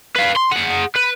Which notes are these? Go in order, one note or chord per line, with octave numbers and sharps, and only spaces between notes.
B4 F5
C6
G#4 F#5
B4